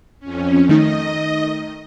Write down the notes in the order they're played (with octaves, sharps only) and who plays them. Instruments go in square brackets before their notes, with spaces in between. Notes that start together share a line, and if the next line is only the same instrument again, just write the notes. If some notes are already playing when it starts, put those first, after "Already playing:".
[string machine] F2 C#4
[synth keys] D#3 A3 D#4 [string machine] D#5